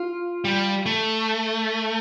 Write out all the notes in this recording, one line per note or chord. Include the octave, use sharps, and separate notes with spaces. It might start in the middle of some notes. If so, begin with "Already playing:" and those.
Already playing: F4
G3
A3